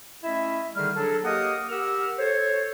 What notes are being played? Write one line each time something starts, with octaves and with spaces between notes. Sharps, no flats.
A3 C#4 E4 D#5 E5
D3 D#3 G3 D#4 G#4 F6
F#3 D4 G#4 A4
A#3 G4 A#4 D#5 F#5 D#6
G4 A#4 F#5 E6 F6
A4 C5 C#5